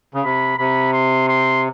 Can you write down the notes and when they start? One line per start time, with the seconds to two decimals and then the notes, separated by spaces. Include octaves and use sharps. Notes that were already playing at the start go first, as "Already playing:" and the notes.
0.14 C#3
0.24 C3 B5
0.58 C3 B5
0.93 C6
1.29 C6